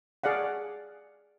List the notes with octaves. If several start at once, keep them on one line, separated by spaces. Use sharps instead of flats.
G#4 D5 F5 F#5